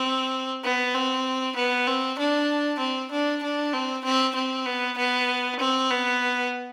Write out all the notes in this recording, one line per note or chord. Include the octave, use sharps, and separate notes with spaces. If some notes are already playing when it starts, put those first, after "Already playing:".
Already playing: C4
B3
C4
B3
C4
D4
C4
D4
D4
C4
C4
C4
B3
B3
C4
B3